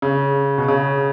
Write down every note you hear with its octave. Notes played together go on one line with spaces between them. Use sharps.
C#3
B2
C#3